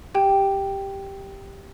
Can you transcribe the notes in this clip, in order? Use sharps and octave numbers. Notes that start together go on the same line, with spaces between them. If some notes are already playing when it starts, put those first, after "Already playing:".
G4 G5